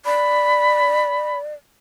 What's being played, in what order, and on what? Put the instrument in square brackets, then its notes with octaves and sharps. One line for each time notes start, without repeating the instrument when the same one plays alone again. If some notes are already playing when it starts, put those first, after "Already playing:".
[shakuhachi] D5 [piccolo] B5